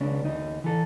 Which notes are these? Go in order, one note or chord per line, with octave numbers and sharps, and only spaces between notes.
C#2 C#4 D4
D2 D#4
E3 A4